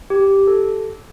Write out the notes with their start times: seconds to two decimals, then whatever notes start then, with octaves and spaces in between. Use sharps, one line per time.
0.10 G4
0.47 A4